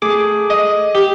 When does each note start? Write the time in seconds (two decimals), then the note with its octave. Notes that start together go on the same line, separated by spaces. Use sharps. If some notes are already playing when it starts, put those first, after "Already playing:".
0.02 A3 G#4 D6
0.50 D#5
0.95 G4